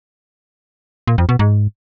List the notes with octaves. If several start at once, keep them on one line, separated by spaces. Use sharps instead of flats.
A#2
F2
B2
G#2